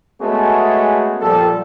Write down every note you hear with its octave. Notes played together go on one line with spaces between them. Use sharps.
G#3 A3 B3 C#4 F#4 G#4
A#2 F3 G3 G4 A4